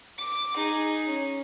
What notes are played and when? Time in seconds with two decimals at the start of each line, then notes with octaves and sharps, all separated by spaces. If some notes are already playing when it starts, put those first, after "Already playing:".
0.18 D6
0.55 D#4 G#4
1.08 C#4